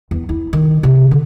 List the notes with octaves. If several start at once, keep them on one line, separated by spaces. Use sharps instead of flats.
E2
E4
D#3
C3
D3